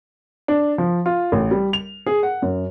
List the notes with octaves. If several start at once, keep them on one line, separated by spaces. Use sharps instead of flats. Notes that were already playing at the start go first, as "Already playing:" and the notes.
D4
F3
F4
A1
G3
F7
G#4
F#5
F#2